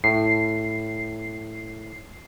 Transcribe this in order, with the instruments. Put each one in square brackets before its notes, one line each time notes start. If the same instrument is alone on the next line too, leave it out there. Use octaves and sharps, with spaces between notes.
[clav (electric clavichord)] A2 [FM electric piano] C7